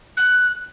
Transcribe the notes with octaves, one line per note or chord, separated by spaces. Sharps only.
F#6